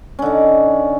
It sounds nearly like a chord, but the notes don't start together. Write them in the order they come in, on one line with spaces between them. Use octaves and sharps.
C#4 D3 D#4